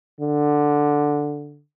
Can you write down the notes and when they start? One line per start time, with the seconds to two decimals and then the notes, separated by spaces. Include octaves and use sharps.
0.20 D3